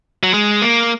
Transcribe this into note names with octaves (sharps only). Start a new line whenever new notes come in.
F#3
G#3
A#3